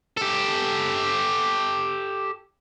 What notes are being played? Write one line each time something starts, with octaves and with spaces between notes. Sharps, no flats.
G4 A4